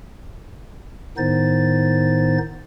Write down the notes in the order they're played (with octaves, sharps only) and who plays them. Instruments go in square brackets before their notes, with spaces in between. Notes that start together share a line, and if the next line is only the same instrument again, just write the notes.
[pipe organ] A2 D#3 B3 D#4 C5 A6